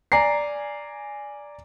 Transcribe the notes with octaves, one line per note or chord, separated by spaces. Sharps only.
D5 G#5 A#5 C7